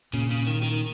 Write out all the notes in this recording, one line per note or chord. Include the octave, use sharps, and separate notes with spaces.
A#2 C#3
C#3
D#3
D#3